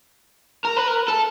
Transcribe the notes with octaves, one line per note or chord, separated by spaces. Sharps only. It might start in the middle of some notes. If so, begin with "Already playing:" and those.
A#4
B4
A#4
A4